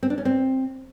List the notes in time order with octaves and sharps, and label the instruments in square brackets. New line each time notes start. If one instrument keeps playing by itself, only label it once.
[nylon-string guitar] C4
D4
C#4
C4